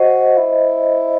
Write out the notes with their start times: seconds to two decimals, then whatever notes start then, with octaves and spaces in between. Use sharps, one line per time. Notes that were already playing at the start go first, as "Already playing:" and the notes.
Already playing: F#4 C5 D#5
0.37 E4